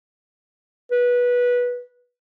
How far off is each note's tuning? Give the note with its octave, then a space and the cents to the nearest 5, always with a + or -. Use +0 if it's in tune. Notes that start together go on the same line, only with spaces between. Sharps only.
B4 -15